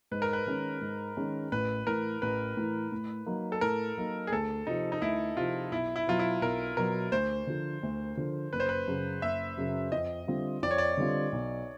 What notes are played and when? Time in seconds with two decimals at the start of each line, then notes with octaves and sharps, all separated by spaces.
0.11 G#2 B4
0.22 A#4
0.33 B4
0.46 D#3 G#3 C#4
0.81 G#2
1.17 D#3 G#3 C#4
1.52 A1 B4
1.87 A2 E3 A#4
2.22 A1 B4
2.57 A2 E3
2.92 A2
3.26 F#3 A#3 D#4
3.52 A4
3.61 A2 A#4
3.97 F#3 A#3 D#4
4.27 G#4
4.32 D2 A4
4.67 C3 F3 D#4
4.92 D#4
5.02 D2 E4
5.37 C3 F3 F4
5.72 B1 E4
5.96 E4
6.07 B2 F#3 F4
6.19 E4
6.42 B1 A#4
6.77 B2 F#3 A#4
7.12 D2 C5
7.47 D3 F3
7.83 D2
8.17 D3 F3
8.53 F#1 B4
8.60 C5
8.69 B4
8.87 F#2 C#3 F#3
9.22 F#1 E5
9.57 F#2 C#3 F#3
9.92 F2 D#5
10.27 D3 G3 C4 F4
10.63 F2 D5
10.71 C#5
10.78 D5
10.97 D3 G3 C4 F4
11.32 B1